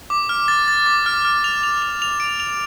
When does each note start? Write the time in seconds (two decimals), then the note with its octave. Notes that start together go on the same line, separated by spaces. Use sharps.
0.10 D6
0.29 F6
0.48 A6
0.68 A6
0.86 D6
1.06 F6
1.25 F6
1.44 F7
1.63 F7
1.82 F7
2.02 F7
2.20 D7
2.40 F7